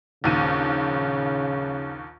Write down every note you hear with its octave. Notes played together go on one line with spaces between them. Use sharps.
A#1 D#2 C#3 D#7